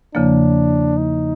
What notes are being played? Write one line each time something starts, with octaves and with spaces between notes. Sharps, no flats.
E2 C#3 F3 A#3 D4
D#4